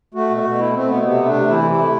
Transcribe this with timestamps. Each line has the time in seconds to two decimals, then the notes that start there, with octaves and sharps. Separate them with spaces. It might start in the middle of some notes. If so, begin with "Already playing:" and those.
0.14 A3 F#4
0.30 B2
0.37 F#4
0.44 B2
0.58 A3 E4
0.74 A3 C4
0.88 B2 B3
1.03 C3 B3
1.18 A3
1.25 D4
1.33 C3
1.48 E3 E4
1.63 C3
1.71 E4
1.78 A3